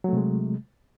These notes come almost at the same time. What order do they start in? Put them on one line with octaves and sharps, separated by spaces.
F#3 A3 C3 G#3